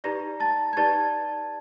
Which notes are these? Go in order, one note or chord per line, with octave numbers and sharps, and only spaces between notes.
D#4 G4 B4 D5 A#5 A#6
A5 A6
G#6
D#4 G4 B4 D5 A5 A6